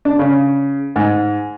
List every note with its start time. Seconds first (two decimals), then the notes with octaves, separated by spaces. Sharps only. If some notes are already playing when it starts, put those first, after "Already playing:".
0.05 D4
0.19 C#3
0.96 G#2